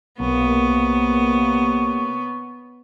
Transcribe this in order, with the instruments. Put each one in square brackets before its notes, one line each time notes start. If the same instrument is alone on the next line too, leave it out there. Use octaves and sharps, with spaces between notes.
[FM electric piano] B1 [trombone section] C3 A#3 [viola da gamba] B3 [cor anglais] C#5